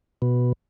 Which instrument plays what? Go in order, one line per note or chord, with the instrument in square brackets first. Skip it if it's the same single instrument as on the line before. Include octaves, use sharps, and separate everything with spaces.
[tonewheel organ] B2